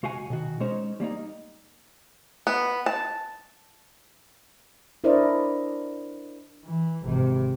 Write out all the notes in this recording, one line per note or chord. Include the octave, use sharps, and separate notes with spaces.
C#2 F#4 F5 F#5 G#5
B2 D#3 F#4
G#3 C#4 D#4 C5 C#5
G3 A#3 D4 D#4
B3
A5
D4 E4 A#4 C5 D5 D#5
E3
G#1 C3